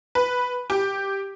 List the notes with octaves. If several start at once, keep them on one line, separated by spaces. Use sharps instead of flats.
B4
G4